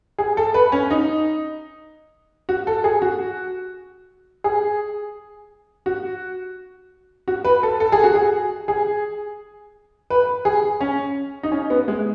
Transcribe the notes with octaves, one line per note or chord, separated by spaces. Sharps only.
G#4
A4
B4
C#4
D#4
F#4
A4
G#4
F#4
G#4
F#4
F#4
B4
A4
A4
G#4
F#4
G#4
G#4
B4
G#4
C#4
D#4
C#4
B3
G#3